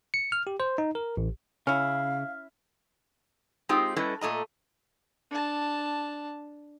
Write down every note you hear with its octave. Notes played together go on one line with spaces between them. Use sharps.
C#7
F6
G4
C5
D#4
A#4
A1
C#3 C#4 E4 F5 F6
G#3 C4 D#4 F4 G4
G3 C#4 E4 A4 B4 D#5
A#2 A3 D#5 A#5
D4 A5